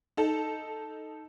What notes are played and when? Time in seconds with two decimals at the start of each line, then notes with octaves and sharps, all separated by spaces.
0.17 D#4 A4